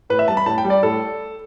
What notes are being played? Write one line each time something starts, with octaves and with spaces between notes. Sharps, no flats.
A2 B4
E5
G3 A5
B5
A2 A5
G5
G3
D5
A2 A4